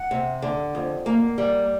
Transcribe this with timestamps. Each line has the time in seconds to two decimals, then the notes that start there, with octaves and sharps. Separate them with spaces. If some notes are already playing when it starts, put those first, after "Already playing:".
Already playing: F#5
0.11 C3
0.42 D3
0.75 F2
1.06 A#3
1.38 G3